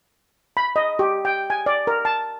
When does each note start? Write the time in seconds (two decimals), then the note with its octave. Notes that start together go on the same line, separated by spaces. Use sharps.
0.57 B5
0.76 D#5
0.99 G4
1.25 G5
1.50 G#5
1.66 D5
1.87 A#4
2.05 A5